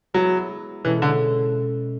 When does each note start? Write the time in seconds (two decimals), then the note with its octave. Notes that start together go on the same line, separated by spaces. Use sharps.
0.14 F#3 G#3 B3 E4
0.85 B2 E3 G#3 C#4 E4 A4
1.02 D3